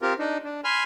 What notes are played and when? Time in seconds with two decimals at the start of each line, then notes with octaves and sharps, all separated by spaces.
0.02 C4 F4 G4 A#4
0.19 D4 D#4
0.44 D4
0.64 G#5 B5 C6 F6